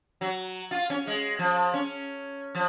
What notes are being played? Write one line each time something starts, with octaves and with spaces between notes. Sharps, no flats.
F#3
F4
C#4
G#3
F3
C#4
F3